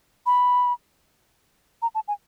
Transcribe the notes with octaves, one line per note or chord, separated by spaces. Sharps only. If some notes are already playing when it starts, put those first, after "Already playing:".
B5
A#5
A5
G#5